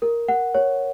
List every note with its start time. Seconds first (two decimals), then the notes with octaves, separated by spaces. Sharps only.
0.02 A#4
0.28 F#5
0.54 C#5